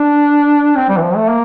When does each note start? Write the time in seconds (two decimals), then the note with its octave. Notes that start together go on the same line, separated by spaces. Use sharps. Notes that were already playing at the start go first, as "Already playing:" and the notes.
Already playing: D4
0.76 C4
0.89 G3
0.97 E3
1.02 F3
1.16 A3
1.29 A#3